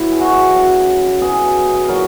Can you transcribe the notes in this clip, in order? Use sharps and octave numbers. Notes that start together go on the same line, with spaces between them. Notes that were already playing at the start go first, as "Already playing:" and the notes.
Already playing: B2 F#3 E4
G#4
F#4
C#3 F#3
B2 F#3 G#4
A#2 F#3 A#4